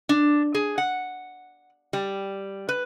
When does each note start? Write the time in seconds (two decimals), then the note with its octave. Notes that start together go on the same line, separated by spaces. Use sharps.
0.09 D4
0.54 G#4
0.78 F#5
1.93 G3
2.69 B4